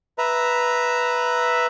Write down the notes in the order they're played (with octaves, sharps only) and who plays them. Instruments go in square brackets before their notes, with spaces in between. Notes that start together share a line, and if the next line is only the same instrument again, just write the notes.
[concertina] B4 E5 A#5